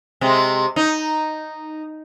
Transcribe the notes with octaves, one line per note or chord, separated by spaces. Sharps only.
C3 G#3
D#4